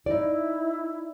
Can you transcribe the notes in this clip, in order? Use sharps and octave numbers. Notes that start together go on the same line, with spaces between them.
D#4 E4 D5